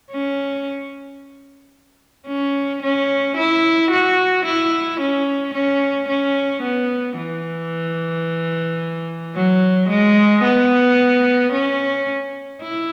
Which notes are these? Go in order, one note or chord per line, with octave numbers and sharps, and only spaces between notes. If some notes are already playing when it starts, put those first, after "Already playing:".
C#4
C#4
C#4
E4
F#4
E4
C#4
C#4
C#4
B3
E3
F#3
G#3
B3
C#4
E4